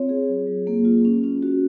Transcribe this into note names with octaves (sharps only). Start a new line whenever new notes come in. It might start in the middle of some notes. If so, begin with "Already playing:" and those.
Already playing: C4 F4 C#5
G#4
F#3
F#3
A#3
F4
C#4
C#4
F#4